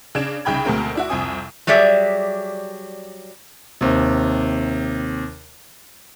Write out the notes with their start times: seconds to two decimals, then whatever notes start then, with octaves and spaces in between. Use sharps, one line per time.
0.15 C#3 D4 G#6 E7
0.45 C2 C#3 D#4 G5 B5 G#6
0.65 D2 B2 G#3 A3 C4 A#4
0.95 D4 E4 F#4
1.09 C2 F2 C4 G#5 D#6
1.67 F#3 G3 G#4 D5 E5
3.81 D#2 C3